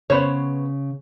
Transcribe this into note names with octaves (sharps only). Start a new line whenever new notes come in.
C#3 B3 C5 C#5